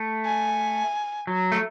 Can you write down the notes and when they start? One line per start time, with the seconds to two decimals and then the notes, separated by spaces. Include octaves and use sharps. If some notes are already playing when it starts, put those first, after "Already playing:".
Already playing: A3
0.25 G#5
1.27 F#3
1.52 A3